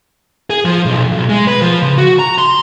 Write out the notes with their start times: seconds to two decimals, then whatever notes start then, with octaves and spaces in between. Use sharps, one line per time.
0.50 G#4
0.65 F3
0.85 B1
1.12 B1
1.29 G#3
1.47 B4
1.62 F3
1.82 C#3
1.98 F#4
2.19 A#5
2.38 C6